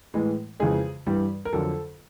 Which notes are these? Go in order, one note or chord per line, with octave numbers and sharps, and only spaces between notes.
A2 E3 G#3
F2 C#3 E3 G#3 G#4
G2 E3 G3
A#4
F2 D3 F#3 A4